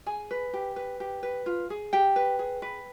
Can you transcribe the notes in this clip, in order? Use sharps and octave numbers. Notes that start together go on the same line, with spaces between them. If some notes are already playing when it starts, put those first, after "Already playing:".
G#4 G#5
B4
G4
B4
G4
B4
F4
G#4
G4 G5
B4
G#4
B4